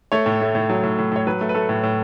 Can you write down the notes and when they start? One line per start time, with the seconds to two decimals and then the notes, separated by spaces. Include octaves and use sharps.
0.12 A3 C#5
0.26 A2
0.41 A3
0.55 A2
0.70 F#3
0.83 A2
0.98 A2
1.12 A2 C#5
1.27 F#3 B4
1.41 A3
1.49 B4
1.55 A3 A4
1.69 A2
1.83 A2